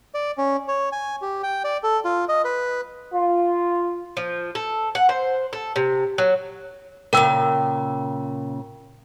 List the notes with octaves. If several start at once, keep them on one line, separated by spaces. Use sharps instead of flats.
D5
C#4
C#5
G#5
G4
G5
D5
A4
F4
D#5
B4
F4
F3
A4
F#5
C5
A4
C3
F#3
A#2 C#3 A#4 G5 E6